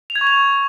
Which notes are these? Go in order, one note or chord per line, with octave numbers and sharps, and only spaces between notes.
F7
G#6
C#6
F7